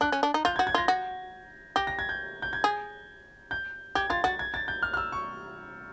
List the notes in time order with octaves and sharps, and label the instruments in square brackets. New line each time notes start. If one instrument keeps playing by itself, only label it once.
[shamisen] D4 [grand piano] F#6
[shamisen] C#4
D4
D#4
[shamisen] F4 [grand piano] G6
[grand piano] G#6
[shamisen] F#4
[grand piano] G#6
[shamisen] F4 [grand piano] A#6
[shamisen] F#4
[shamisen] G4 [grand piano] A#6
[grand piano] A#6
G#6
G6
G6
G#6
[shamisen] G#4
[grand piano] G6
[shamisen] G4 [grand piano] G#6
[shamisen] F4 [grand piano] A6
[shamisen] F#4 [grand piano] A6
[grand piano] G#6
A6
G6
F6
F6
E6
C#6